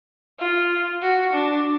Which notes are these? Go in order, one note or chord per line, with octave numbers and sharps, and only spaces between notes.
F4
F#4
D4